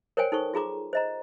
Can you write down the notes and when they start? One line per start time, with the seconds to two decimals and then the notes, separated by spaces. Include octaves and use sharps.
0.17 A#4 C5 C#5 G5 G#5
0.32 D#4 A4 C5 C#6
0.54 F4 G#4 A#5 D6
0.93 C5 D#5 A#5